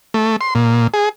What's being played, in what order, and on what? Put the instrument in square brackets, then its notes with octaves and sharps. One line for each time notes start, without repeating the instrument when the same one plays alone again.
[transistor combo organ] A3
C6
A#2
G#4